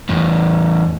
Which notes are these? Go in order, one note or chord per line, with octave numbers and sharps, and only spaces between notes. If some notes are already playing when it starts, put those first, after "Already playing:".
E2 A2